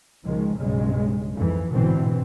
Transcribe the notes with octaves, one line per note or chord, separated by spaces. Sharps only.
C#2 D#3 F3 G#3
B1 G2 C#3 G#3
F2 G#2 E3
A1 G#2 B2 D3 E3 C4